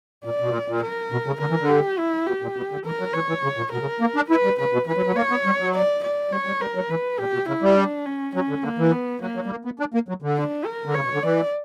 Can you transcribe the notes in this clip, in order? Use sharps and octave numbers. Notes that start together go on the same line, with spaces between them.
A#2 D5
B2
A#2
A#2
A#4
B2
C#3
D3 A#4
E3
D3
G4
E4
B2 G4
A#2
B2
D3
E3 A#4
F#3
E3 C#5
E3
C#3
A#2
B2 A#4
C#3
A#3
D4
E4 B4
G3
C#3 B4
B2
E3 B4
F#3
F#3
A#3 C#5
B3
G3
F#3
D5
D5
G3 C#5
G3
G3 A#4
F#3
E3 B4
A#2 G4
B2
C#3 E4
G3
D4
C#4
F#3 C#4
D3
D3 A#3
E3
B3
F#3 A#3
F#3
G3
A#3
B3
D4
A#3
F#3
D3
D4
A#4
D3
C#3 C#5
B2
D3
E3 D5